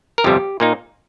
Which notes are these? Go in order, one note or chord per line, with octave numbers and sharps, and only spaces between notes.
A#4
G1 F2 C3 G3 G4
A#2 A#3 D#4